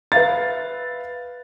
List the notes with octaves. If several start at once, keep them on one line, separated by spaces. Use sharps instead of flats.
B4 E5 F5 A6